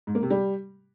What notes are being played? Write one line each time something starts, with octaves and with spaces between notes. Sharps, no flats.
G#2
A#3
C3
G3